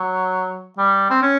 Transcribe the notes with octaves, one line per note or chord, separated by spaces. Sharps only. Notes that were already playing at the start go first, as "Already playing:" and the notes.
Already playing: F#3
G3
C4
C#4